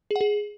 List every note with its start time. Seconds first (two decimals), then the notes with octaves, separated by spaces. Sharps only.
0.11 G#4
0.16 F#5
0.21 G#4